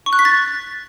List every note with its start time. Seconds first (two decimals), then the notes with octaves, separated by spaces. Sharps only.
0.06 C#6
0.13 F#6
0.19 B6
0.25 A6